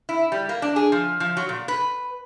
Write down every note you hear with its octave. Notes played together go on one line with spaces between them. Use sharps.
E4
G3
A#3
D4
G#4
F3
F3
F#3
A#2
B4